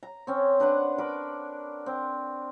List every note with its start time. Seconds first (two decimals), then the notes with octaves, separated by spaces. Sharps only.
0.03 A#5
0.27 C4 C#4
0.60 D4 B4 D5 F#5
0.98 A#4 B5 D6
1.86 C4